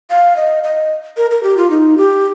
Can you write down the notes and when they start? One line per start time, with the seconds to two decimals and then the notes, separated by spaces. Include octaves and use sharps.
0.10 F5
0.36 D#5
0.64 D#5
1.17 A#4
1.31 A#4
1.43 G4
1.57 F4
1.70 D#4
1.97 G4